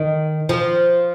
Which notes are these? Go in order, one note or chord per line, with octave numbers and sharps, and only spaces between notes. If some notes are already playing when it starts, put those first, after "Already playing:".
Already playing: D#3
F3